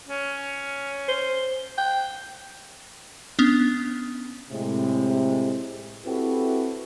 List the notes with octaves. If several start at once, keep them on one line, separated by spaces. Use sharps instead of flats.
C#4
C5
G5
B3 C#4 D4
A2 C3 G#3
C4 E4 F#4 G4 A4 B4